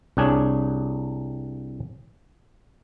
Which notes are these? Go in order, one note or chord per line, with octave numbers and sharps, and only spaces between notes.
C2 D4 G#4 C#5